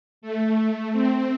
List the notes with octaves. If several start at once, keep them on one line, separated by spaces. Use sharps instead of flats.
A3
C4